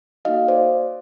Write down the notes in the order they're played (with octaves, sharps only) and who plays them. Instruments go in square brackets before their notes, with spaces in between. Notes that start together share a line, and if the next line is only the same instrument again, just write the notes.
[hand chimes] A#3 D#4 F#4 A4 D#5 F5
C5 D5